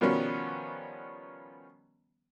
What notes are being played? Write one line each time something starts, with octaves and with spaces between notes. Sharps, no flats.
B2 D#3 F3 G3 B3 C#4